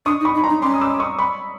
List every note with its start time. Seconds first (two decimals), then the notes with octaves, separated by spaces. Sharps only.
0.06 D4 C#6 D#6
0.20 D#4
0.25 B5 C#6
0.35 D#4
0.37 B5
0.44 A#5 C6
0.49 D#4
0.62 C#4 C6 D6
0.74 D#6
0.81 D6 E6
0.94 D6
1.00 C#6 D#6
1.19 B5 C#6